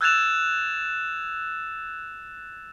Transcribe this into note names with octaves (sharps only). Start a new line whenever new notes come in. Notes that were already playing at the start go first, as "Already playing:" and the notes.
E6 F#6 G#6 A6 E7 F7